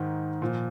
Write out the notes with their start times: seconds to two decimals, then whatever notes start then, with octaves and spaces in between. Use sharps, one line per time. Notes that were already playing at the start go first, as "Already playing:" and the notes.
Already playing: G#2 D#3
0.42 A#2 F3